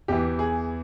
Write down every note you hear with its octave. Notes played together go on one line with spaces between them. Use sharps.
E2 E3 G4
G#4